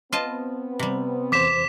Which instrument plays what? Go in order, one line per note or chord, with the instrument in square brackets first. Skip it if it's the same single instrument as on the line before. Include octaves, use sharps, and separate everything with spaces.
[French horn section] B3 C4 [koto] F4 D#5 A5
[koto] C3 G3
[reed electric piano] E2 C5 [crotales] D6 B6 E7